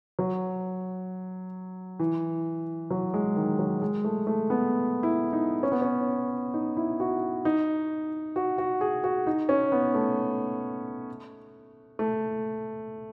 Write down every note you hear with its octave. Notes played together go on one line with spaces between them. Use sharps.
F#3
E3
F#3
G#3
D#3
F#3
G#3
A3
A3
B3
E4
D#4
C#4
B3
C#4
D#4
E4
F#4
D#4
F#4
F#4
G#4
F#4
D#4
C#4
B3
A3
A3